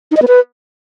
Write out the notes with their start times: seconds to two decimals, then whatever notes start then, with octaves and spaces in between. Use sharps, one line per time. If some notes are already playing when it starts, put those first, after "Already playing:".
0.11 D#4
0.17 D#5
0.22 B3
0.28 B4